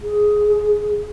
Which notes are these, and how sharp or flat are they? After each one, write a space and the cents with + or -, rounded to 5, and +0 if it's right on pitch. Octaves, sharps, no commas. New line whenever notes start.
G#4 +10